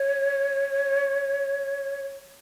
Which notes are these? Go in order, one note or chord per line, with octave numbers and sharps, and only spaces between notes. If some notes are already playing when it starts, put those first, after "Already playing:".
Already playing: C#5